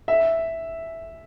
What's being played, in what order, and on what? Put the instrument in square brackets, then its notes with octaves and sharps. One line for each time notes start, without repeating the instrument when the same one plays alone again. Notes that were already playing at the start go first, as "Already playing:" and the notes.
[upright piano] E5